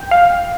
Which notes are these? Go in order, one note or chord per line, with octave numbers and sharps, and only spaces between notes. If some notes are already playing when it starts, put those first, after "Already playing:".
Already playing: G5
F5